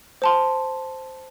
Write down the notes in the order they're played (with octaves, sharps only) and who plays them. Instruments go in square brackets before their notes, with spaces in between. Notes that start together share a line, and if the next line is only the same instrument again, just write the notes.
[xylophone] C5 A5 C6